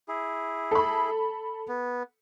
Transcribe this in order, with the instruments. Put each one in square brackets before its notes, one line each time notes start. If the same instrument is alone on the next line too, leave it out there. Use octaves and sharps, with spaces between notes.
[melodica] E4 G#4
[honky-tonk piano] A4 B5
[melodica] B3